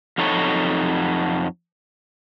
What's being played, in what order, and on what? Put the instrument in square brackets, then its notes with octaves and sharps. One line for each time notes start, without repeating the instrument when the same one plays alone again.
[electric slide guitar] F2 F#3 D#4 A4 C#5